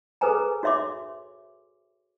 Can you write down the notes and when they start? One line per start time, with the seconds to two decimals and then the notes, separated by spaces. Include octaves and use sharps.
0.21 G#4 A4 B4 C5 G#5 A#5
0.63 F#4 C#5 E5 C6 D6